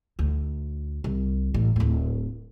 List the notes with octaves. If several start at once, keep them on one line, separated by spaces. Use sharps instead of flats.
D2
C2
A1
D1 A2